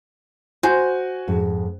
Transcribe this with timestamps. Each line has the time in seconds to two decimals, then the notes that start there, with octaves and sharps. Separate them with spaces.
0.63 F#4 C5 G#5
1.27 F2 G#2